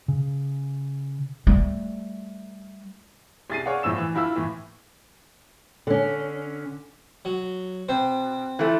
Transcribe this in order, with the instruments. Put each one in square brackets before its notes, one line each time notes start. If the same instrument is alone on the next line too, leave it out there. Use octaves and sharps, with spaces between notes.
[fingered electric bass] C#3
[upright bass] G3 A3
[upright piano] C2 G#4 A6 C7 D#7
G#4 C#5 D5 F5 F#5
A#1 A2 F3 E6 E7
E3
G1 E4 F4 E6
A2 E3
[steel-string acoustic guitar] D3 C#4
[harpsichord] F#3
[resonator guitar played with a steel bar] B2 [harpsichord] C4 C5
[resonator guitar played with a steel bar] E3 F3 A3